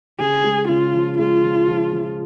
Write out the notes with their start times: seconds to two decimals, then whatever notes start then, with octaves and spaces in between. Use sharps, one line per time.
0.20 C#3 G#4
0.44 G#3
0.69 C#3 F4
0.94 F3
1.18 G#3 F4
1.44 F3
1.68 F3
1.93 F3